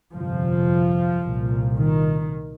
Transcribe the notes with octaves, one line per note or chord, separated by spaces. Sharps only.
G1 F2 C3 F3
C2 A#2
D#3